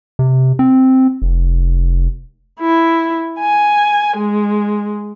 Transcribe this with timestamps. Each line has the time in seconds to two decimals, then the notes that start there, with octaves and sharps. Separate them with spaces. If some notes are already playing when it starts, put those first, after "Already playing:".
0.19 C3
0.59 C4
1.22 F1
2.61 E4
3.39 G#5
4.18 G#3